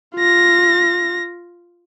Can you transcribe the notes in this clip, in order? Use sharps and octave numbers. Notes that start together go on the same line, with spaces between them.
F4 A#6